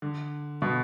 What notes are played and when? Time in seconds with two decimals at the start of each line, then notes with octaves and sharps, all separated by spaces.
0.02 D3
0.62 B2